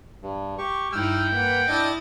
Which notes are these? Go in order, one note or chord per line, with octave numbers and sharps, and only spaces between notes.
G2
G4 C#6
G2 D#4 E4 G5 E6 F6
A#3 B4 F#5
D4 E4 D#5 A6